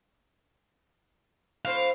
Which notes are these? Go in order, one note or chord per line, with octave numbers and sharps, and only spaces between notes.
A2 C4 C5 F5